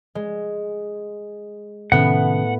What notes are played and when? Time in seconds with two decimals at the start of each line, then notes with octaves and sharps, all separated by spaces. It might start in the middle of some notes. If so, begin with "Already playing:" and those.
0.15 G#3
1.92 A2 C3 D#3 B3 C#4 F#5